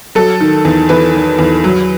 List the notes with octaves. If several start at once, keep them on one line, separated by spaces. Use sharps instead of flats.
F#3 A4
D#3
E2
E2 B4
D#3
E2
F#3